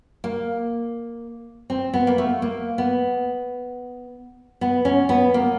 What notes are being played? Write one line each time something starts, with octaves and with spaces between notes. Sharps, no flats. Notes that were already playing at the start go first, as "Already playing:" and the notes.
A#3
C4
B3
A#3
A3
A#3
B3
B3
C#4
B3
A#3